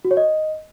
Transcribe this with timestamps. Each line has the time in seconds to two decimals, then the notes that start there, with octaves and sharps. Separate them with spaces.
0.05 F#4
0.11 C#5
0.17 D#5